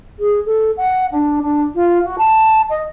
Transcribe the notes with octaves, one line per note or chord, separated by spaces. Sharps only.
G#4
A4
F#5
D4
D4
F4
F#4
A5
D#5